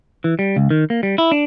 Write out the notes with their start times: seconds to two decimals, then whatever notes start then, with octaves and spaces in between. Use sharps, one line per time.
0.24 E3
0.39 G3
0.56 C#2
0.71 D#3
0.90 A#3
1.03 G3
1.18 E4
1.32 D4